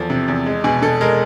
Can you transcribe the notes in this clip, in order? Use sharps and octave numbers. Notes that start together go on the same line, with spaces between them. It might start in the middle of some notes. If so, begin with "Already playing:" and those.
Already playing: E2 F3 A4
C3
E2
G#3
B2 G#4
B2 A4
G#3 A#4